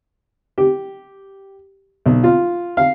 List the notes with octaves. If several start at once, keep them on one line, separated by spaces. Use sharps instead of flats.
G4
B1
F4
F5